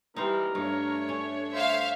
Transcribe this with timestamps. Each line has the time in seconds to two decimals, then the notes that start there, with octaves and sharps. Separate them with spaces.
0.16 E3 G3 D#4 A#4 C5
0.55 G2 A3 D4 C#5
1.09 C#4
1.53 C5 E5 F5